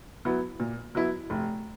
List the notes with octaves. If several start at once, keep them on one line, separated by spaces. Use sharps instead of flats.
F#3 B3 E4
A#2
F#3 B3 E4
F1